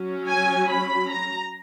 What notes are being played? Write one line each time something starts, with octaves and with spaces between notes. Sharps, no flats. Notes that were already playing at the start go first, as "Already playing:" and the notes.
Already playing: F#3 C#4
G#5
B5
A#5